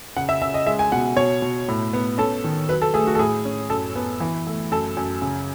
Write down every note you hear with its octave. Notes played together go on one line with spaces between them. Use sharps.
C#3 F#5
E5
C#3 E5
D#5
G#3 E5
G#5
B2 F#5
B2 C#5
B2
A2
B3
C#4 A4
D#3
F#3 B4
A4
A3 G#4
F#4
A4
A2 G#4
C#4
F#2 A4
B3
E3
A3
F#2 A4
F#2
C#3